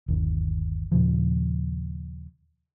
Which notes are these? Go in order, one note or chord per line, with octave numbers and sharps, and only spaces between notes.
G1 D#2
D#2 A#2 C#3 F3